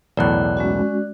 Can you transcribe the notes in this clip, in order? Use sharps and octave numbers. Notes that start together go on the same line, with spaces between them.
B1 E2 A2 D5 F#6
G#3 C#4 F#4